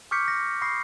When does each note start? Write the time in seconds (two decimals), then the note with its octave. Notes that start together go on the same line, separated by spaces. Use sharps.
0.11 C#6 D6 F6 G6 B6 C#7
0.28 A#6
0.62 B5 C#6 D#6 A#6 C7